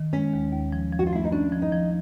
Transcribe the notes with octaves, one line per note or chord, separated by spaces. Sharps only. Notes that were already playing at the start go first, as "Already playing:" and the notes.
Already playing: D#3
G#3 C#4
D#2
D#2
F3
F3
F#4
F4
A3 E4
D#4
C#4 D4
F3
D#4
F3